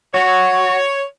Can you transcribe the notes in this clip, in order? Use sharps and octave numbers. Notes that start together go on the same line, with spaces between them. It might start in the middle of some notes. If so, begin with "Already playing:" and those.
F#4 C#5